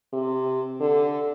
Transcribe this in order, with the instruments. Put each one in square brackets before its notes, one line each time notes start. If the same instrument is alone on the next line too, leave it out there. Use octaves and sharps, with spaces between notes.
[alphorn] C3
D3